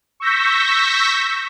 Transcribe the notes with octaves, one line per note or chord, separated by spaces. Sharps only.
C#6 E6 G6 A#6 B6